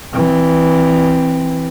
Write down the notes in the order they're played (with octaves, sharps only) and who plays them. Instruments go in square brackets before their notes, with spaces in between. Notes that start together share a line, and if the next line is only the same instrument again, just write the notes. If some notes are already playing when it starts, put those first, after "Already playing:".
[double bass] E3 C4